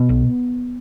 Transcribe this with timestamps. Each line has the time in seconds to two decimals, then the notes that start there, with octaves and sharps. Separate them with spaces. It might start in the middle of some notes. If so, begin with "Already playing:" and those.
Already playing: B2 B3
0.09 B1